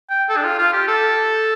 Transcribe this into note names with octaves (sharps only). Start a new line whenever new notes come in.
G5
A4
D4
F4
F4
G4
A4